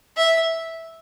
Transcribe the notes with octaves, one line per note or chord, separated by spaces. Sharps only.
E5